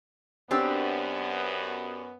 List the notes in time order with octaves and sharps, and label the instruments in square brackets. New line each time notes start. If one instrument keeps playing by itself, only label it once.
[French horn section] F#2 B3 [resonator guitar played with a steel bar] C4 D4 G4